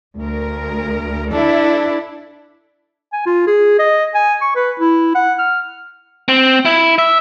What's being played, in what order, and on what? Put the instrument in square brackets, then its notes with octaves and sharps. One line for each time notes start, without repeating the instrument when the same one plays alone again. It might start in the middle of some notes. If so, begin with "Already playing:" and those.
[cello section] D2 A#4
[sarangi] D4 [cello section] E4 A4
[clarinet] G#5
F4
G#4
D#5
G#5
C#6
B4
E4
F#5
F6
[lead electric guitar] C4
E4
E5